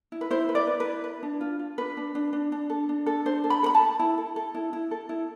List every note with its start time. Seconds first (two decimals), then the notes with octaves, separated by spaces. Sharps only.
0.12 E4
0.21 B4
0.31 E4 C5
0.49 B4
0.55 D5
0.67 B4
0.80 B4
0.86 E4
1.04 B4
1.23 D4
1.41 F4
1.59 F4
1.78 D4 B4
1.97 D4
2.15 D4
2.33 D4
2.52 D4
2.70 A4
2.89 D4
3.06 A4
3.25 D4 C5
3.44 A4
3.50 B5
3.63 A4
3.66 B5
3.75 A5
3.81 A4
3.99 E4
4.18 A4
4.36 A4
4.55 E4
4.73 E4
4.91 A4
5.09 E4